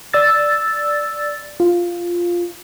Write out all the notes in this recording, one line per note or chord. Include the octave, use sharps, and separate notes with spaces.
D5 E6 A6
F4